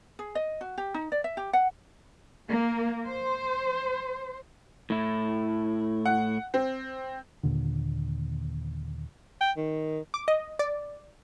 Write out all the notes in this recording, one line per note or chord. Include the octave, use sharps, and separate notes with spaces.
G#4
D#5
F#4
G4
D#4
D5
E5
G4
F#5
A#3
C5
A2 E4
F#5
C4
D#2 A#2 D3
G5
D#3
D6
D#5
D5